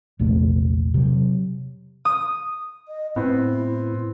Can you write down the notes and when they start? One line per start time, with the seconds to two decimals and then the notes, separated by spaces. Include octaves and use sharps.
0.19 A#1 E2 C3 A3
0.94 C3 F#3
2.05 D#6
2.87 D#5
3.16 A2 B3 C4 E4